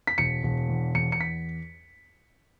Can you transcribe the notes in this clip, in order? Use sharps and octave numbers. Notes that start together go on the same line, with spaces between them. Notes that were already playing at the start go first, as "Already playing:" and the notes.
B6
E1 C#7
E1
E2
E2 C#7
C#7
B6